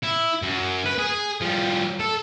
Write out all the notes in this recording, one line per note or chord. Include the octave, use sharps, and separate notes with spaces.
E4
F#2
B4
G#4
F3 G3
A4